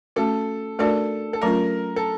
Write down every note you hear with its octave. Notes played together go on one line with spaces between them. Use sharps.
A3 C#4 F#4 A4
A3 D4 F#4 A4 A#4 D5
A4
F#3 A3 C#4 F4 A#4
A4